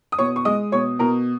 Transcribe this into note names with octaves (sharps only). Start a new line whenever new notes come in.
D#6
B2 C#5 C#6
C#6
G#3 D#5 D#6
B2 C#5 C#6
B2 A#4 A#5